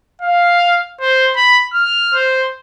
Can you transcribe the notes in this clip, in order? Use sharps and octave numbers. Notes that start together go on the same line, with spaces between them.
F5
C5
B5
F6
C5